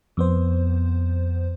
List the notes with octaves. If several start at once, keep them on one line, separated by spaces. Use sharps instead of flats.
F2 B3 C5